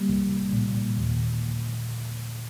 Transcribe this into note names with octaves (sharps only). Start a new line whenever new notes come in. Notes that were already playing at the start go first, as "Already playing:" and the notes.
Already playing: G3 A#3
C2
A#2
D#2